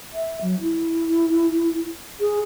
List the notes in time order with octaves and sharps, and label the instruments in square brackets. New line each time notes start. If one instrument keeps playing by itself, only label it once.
[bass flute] E5
F#3
E4
G#4